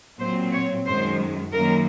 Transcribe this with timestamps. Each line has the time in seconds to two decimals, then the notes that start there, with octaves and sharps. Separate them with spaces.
0.21 A#2 F#3 C4 C5
0.53 C#5
0.86 F#2 D#3 G#3 C5
1.52 F#2 D#3 F#3 A#3 A#4